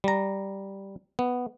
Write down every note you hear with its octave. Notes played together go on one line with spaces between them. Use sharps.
G3 A#5
B3